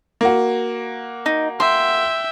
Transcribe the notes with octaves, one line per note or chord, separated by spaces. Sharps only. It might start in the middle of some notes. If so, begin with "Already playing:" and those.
A#3 F#4
D#4
E5 G5 C6